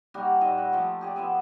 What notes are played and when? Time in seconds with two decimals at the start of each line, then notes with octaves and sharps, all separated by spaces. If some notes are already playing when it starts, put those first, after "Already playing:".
0.14 G3 A#3 D#4 F#4
0.41 A#2 D#3 D#5 E5
0.57 E5 F#5 B5
0.72 F3 A3 A#3
1.00 F4 G4 G#4 D5
1.16 F3 B3 E5 G#5